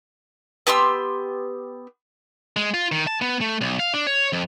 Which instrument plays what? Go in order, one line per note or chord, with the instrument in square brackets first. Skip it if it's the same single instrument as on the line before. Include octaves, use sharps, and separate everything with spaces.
[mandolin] B3 G4 C6 E6
[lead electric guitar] G#3
F4
D#3
A5
B3
A3
B1
F5
D4
C#5
F2